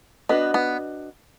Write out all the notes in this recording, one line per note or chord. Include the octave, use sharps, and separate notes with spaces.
B3 D4 F#4 B4 D#5
B3